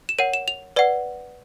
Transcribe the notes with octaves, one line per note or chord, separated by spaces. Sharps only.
E7
A#4 C#5 F#5 D#7
E7
F7
B4 D5 F#5